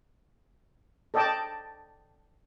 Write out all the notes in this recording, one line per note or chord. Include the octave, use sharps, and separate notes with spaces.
A4 D5 D#5 G5 A5 D6